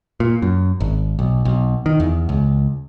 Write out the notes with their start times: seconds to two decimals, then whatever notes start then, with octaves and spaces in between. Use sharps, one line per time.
0.20 A#2
0.42 F#2
0.80 G#1
1.19 B1
1.45 B1
1.86 D#3
2.00 E2
2.29 C#2